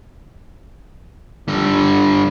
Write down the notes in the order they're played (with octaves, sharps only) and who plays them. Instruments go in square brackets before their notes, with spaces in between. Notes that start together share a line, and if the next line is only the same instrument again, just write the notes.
[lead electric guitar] D3 G3